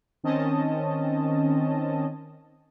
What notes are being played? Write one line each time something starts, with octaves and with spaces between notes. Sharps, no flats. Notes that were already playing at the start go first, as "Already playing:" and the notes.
D#3 C4 C#4 D#5 A5